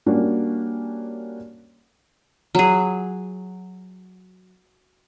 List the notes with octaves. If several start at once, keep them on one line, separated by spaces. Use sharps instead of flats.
G3 A#3 C#4 D4 F#4
F#3 G#4